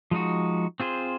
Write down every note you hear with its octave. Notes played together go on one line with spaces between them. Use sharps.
F3 G#3 D#4 F#4
C4 F4 G#4 C5